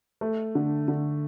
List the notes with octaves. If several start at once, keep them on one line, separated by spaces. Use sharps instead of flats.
A3
D3
D3